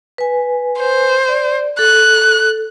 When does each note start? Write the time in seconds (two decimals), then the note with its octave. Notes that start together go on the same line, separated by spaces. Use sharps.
0.18 B4 G#5
0.80 C5
1.29 D5
1.79 A4 F#6